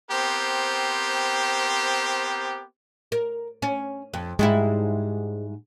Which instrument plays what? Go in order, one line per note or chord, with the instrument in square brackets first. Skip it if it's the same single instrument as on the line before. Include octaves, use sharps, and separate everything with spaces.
[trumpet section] B3 C4 G4 A#4 C5
[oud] A#4
C#4
F2
[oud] G#2 G3 E4 [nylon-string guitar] G#3